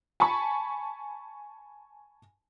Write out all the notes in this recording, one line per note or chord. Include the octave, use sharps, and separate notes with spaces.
G#5 A5 B5 C#6